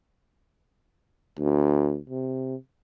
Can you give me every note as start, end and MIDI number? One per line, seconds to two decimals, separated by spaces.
1.39 1.98 38
2.10 2.55 48